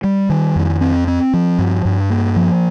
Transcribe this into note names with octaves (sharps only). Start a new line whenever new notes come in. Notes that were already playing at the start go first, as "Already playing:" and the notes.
G3
D#3
F2
C4
C4
F3
G2
G2
A#3
F3